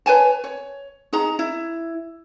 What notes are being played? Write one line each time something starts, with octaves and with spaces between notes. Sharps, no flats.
B4 C#5 G#5 A5
C#5
D#4 G#4 A#5
E4